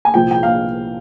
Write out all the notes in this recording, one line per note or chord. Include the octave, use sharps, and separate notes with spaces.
G#5
C2 A#2 F3 G5
G5
F5